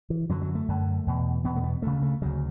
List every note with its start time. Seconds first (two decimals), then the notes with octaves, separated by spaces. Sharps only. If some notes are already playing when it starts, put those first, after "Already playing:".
0.10 E3
0.29 F#2 D3 F#3
0.42 F#3
0.55 A3
0.68 F#2 D3
1.07 E2 B2
1.44 E2 B2 B3
1.56 A3
1.64 B3
1.82 D2 C#3 A3
2.02 A3
2.22 D2 C#3 F#3